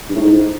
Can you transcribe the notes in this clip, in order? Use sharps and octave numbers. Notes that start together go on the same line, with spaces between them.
G2
A2
G#2